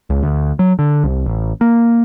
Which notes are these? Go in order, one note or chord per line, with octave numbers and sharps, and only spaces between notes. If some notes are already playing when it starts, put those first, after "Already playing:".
C#2
D2
F#3
D3
C2
A1
A#3